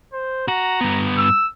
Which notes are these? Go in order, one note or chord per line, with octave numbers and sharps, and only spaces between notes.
C5
F#4 A#5
G2 B3
E6